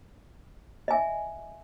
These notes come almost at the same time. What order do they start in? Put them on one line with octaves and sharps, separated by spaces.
D#5 G#5 E5